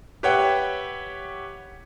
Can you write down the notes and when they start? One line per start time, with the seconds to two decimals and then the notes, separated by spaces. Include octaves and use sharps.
0.23 G4 B4 C#5 E5 F#5 G5